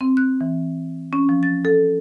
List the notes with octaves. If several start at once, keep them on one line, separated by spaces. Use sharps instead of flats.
C4
F#6
E3
C#4
F3
A6
A4